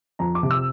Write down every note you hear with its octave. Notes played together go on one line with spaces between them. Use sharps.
F2 A#5
D6
C3
E6